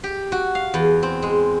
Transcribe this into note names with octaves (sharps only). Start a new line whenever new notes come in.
G4
F#4
F5
E2
C4
G#3